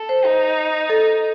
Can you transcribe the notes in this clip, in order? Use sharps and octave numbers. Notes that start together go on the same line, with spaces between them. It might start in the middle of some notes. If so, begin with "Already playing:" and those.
Already playing: A4
C5
D#4 C5
A4